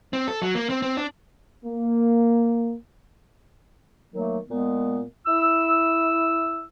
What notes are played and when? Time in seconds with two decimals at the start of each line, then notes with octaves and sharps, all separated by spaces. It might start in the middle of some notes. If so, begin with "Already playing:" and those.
0.13 C4
0.28 A4
0.42 F#3
0.55 A#3
0.70 C4
0.82 C4
0.97 D4
1.65 A#3
4.14 D#3 F#3 A3 A#3
4.48 A#2 G#3 B3
5.26 E4 E6